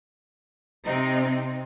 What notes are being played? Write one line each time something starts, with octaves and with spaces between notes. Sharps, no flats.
C3 C4 D#4